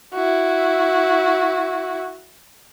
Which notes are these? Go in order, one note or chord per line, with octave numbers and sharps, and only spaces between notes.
E4 F#4